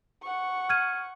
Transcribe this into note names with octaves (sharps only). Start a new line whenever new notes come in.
F#5 C#6
F6 G#6 D#7